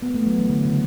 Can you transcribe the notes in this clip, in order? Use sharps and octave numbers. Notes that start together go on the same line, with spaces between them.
B3
A3
F#3
E3
D3
C#3